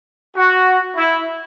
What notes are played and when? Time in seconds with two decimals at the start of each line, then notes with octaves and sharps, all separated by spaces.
0.36 F#4
0.96 E4